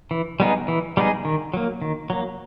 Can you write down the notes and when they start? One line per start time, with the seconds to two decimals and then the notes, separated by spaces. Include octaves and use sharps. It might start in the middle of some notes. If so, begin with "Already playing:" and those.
0.11 E3
0.40 G3 B3 D#4 G#4
0.68 E3
0.97 G3 B3 D#4 G#4
1.25 D#3
1.54 F#3 A#3
1.82 D#3
2.10 F#3 A#3